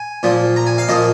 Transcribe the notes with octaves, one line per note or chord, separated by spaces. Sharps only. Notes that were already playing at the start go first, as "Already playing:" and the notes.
Already playing: G#5
A#2 F3
A#5
G#5
F5
A#2 F3 D#5